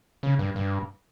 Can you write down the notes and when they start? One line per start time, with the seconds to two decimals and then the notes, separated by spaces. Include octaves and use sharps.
0.23 C#3
0.39 G2
0.56 G2